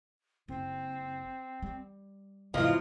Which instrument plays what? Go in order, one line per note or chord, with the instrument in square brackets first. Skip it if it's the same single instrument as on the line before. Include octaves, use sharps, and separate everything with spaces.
[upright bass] F#1 [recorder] C4
[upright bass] G3
[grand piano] E2 E3 [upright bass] G#2 C3 [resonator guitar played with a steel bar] F3 F4 [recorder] D#5